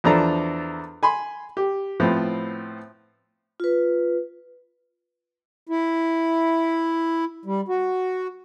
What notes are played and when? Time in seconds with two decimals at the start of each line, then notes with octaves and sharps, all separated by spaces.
0.04 E2 F3 D4 A4 A#5
1.03 G#5 B5 C6
1.57 G4
2.00 A2 F3 B3 C4
3.60 F4 B4
5.69 E4
7.45 G3
7.68 F#4